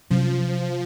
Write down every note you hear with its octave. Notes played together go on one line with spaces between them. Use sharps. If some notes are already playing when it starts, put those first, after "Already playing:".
C3 F3 F#3 C#4